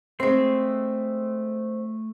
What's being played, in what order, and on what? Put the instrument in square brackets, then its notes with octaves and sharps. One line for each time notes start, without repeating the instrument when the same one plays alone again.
[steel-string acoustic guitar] G#3 C4 [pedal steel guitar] A3 C6